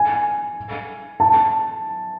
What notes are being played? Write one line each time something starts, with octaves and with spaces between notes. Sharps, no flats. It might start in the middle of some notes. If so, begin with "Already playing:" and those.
Already playing: G#5
A5